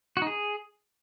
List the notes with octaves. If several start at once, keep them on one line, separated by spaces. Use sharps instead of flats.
F#4
D#4
G#4